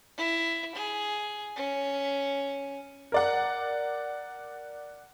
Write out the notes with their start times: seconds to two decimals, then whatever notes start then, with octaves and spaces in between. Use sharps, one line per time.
0.18 E4
0.75 G#4
1.56 C#4
3.12 A#4 D5 F#5